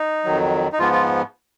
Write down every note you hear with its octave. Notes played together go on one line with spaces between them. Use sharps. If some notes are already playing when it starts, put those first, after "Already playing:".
Already playing: D#4
F2 D#3 F#3
D#4
G#2 F3 B3 F4
F4